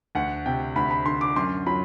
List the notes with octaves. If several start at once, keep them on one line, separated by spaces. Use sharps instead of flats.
D2 F#5
C3 G5
D2 B5
B5
D3 C6
D6
F#2 C6
F#3 B5